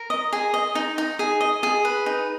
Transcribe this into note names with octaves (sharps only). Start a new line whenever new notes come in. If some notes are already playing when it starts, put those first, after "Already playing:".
Already playing: A#4
D#5
G#4
D#5
D#4
D#4
G#4
D#5
G#4
B4
D#4